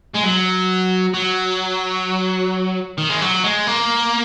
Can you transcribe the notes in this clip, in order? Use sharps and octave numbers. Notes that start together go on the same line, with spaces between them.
G#3
F#3
F#3
D#3
G#3
F#3
G#3
A#3